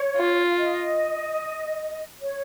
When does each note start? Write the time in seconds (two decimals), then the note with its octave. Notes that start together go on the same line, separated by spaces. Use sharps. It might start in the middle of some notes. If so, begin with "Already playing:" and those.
Already playing: C#5
0.16 F4
0.58 D#5
2.20 C#5